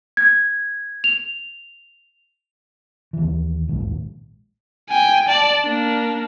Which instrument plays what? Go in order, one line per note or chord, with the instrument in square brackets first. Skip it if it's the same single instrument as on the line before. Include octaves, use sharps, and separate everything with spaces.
[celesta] G#6
F7
[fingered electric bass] D#2 E3
A#1 D#2 G#2
[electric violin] G5 G#5
D5 A5
A#3 D4